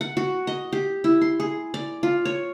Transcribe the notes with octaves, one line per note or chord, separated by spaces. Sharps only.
F#5
F#4
D#5
G4
E4
C6
G#4
D5
F4
C#5